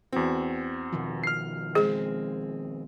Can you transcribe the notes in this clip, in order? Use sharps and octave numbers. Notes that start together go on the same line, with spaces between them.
E2 C4 F#4
B2 D#3 F3
F6 C7
G#3 C4 G#4